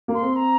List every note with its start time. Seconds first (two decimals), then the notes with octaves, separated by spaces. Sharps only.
0.08 A#3
0.14 C6
0.22 C4
0.36 A#5